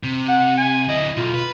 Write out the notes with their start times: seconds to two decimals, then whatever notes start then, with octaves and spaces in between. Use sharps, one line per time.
0.03 C3
0.28 F#5
0.57 G#5
0.89 D2 E4 D#5
1.17 B1 F4
1.34 B4